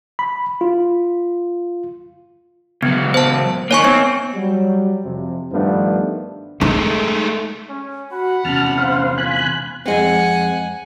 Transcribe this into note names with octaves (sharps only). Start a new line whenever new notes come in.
B5
F4
C#2 F#3 B3
C5 A5
A#3 D#4 C#5 G#5 C#6
B3 C4
F#3 G3
F2 C3
G2 D#3 F3 A3 B3 D4
G#3 A3 D#4
C#4
F#4 F#5 B5
E2 C3 C#4 A5 F6
C5 F5
F4 G#5 B5 F#6
F2 G#3 C4 F#5 G#5